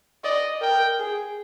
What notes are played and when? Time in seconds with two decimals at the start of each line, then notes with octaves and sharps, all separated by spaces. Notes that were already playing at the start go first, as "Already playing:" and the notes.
0.24 D5 D#5
0.61 A#4 G5
0.99 G#4